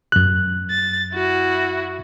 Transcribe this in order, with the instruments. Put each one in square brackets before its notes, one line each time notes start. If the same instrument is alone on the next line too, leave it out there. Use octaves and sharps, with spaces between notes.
[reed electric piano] F#2 F#6
[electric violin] A6
E4 F#4